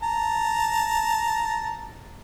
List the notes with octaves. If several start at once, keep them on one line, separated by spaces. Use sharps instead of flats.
A5 A#5